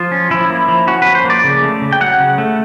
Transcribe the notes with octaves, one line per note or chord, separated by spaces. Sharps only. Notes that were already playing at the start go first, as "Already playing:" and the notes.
Already playing: F3 F4
C#4
F3 E4
A#3
F3
C#4 F#4
F3 B4
C5
A#3
D5
C#3
A3
C#3
G5
F#3 F#5
C#3
A3